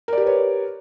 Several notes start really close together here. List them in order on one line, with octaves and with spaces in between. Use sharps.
A#4 D5 G4 B4 C#5